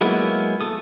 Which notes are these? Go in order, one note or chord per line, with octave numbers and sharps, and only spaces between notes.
F#3 G#3 A#3 B3 E4
A3 A4 D#6